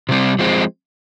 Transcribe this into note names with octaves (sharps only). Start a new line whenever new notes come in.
C3 G3 C4
F3 G#3 C4